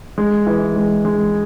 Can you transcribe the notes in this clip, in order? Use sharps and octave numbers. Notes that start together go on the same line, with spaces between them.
G#3
E3
G#3
G#3